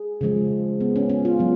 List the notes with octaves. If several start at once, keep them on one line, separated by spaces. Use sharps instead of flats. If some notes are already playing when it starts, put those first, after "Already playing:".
Already playing: G#4
C#3 F3 G#3
B3
C#4
C#4
F4
F#3 B3